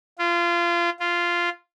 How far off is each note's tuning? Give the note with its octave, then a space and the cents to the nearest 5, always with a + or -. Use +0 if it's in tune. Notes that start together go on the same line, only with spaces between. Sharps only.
F4 -25
F4 -10